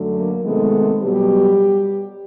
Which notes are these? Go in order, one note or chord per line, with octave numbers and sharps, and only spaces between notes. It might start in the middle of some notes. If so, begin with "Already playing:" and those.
Already playing: F#2 D3 F#3 A3
A#3 A#4
C3 D#3 G#3 A3 B3 A4
B2 F#3 G3 B3 G4